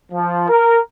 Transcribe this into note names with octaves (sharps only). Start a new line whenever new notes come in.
F3
A#4